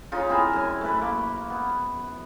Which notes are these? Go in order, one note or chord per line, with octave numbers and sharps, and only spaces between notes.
C#3 D#4 F4
C4 E4 G#4 A#4
F#2 G#5
A3 B4
A#3
B3